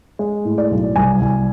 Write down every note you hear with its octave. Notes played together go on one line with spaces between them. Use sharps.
G#3
A2
D5
B1
C2 G#5
C2